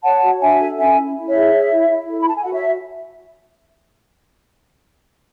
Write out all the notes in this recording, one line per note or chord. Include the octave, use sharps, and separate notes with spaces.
C#5 F#5 A5
F#4
D4 E5 G#5
A4
C#4 E5 G#5
E4
E4
C#5 E5
G#4
C#5
E4
E4
A4
B5
A4 A5
G#5
F#4 F#5
C#5 E5